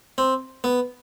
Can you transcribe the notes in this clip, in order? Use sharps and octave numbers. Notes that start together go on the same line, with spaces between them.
C4
B3